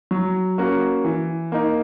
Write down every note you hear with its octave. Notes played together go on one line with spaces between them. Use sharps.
F#3
A#3 C#4 F#4
E3
A#3 D#4